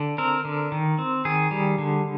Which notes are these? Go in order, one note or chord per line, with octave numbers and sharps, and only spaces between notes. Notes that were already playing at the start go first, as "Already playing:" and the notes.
Already playing: D3
C4 A#4
D3
D#3
C4
D#3 G#4
G3
D3